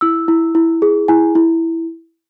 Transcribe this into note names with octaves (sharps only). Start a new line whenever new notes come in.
E4 E6
E4
E4
G#4
E4 G#5
E4